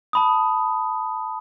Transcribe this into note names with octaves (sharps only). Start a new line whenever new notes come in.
A5 B5 D#6